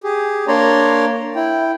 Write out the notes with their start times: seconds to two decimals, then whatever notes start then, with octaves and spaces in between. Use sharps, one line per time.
0.04 G4 G#4
0.48 A#3 D4 C#5 D5 A#5 C6
1.35 E4 G5